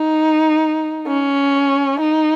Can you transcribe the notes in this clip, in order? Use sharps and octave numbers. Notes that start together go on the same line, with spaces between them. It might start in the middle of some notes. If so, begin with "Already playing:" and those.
Already playing: D#4
C#4
D#4